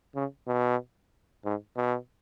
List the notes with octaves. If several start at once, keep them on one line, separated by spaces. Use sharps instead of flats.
C#3
B2
G#2
B2